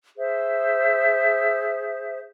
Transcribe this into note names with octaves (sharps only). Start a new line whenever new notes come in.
G#4 C5 E5